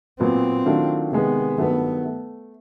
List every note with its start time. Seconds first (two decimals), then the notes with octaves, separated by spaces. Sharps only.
0.20 A#2 F#3 B3 C4
0.66 D#3 F#3 A3 D4 F4
1.12 C3 D#3 G#3 B3
1.58 G2 D#3 F#3 A3 B3
2.04 A3